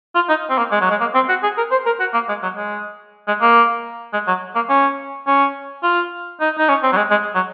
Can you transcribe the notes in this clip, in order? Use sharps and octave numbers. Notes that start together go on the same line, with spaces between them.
F4
D#4
C4
A#3
G#3
F#3
G#3
A#3
C4
F#4
G#4
A#4
C5
A#4
F#4
A#3
G#3
F#3
G#3
G#3
A#3
G#3
F#3
A#3
C#4
C#4
F4
D#4
D#4
C#4
C4
F#3
G#3
G#3
F#3